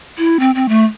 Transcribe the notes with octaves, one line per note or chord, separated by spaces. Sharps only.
E4
C4
C4
A3